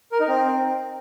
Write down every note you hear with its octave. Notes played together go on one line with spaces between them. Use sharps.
A#4
D#4
C4